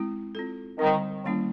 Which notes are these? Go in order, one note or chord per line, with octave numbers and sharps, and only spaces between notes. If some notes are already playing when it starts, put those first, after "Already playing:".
Already playing: G#3 C4 E4
C4 F4 A4
D3 D#3 G3 C4
D#3 G3 A#3 C#4 E4